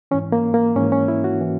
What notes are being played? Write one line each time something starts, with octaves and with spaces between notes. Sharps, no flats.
G#2 E3 C#4
A#3
A#3
G#2 E3 C#4
C#4
E4
F#4
E3